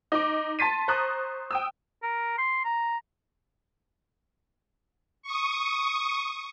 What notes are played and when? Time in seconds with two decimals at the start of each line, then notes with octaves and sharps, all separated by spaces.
0.12 D#4 D6
0.59 A5 C6 A6 B6 D#7
0.88 C5 A#5 C#6 D#6 F#6
1.51 G5 D#6 E6
2.03 A#4
2.38 C6
2.64 A#5
5.22 C#6 D#6